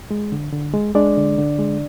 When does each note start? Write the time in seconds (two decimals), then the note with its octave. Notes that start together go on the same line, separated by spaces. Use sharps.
0.11 G#3
0.32 D3
0.52 D3
0.73 G#3
0.95 G#3 D4 D5
1.17 D3
1.38 D3
1.59 G#3